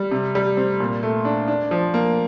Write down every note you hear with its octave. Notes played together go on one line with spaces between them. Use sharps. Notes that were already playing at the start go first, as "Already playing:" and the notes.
Already playing: G3
C3
G3
C4
A#2
A3
D4
D4
F3
A#3